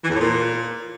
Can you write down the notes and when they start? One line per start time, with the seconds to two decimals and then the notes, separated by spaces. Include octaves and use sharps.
0.04 E3
0.10 E2
0.15 A2
0.21 A#2